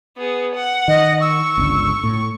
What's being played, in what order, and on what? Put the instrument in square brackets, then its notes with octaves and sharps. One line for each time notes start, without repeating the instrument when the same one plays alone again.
[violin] B3 G#4
F#5
[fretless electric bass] D#3 [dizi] D#5
[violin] C#6 [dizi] E6
[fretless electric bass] G1 C#2 D3
A2